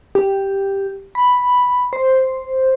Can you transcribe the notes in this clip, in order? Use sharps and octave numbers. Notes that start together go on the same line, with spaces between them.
G4
B5
C5